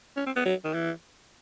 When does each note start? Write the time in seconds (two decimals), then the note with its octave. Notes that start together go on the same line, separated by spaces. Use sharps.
0.17 C#4
0.26 C4
0.36 B3
0.45 F#3
0.64 D#3
0.74 E3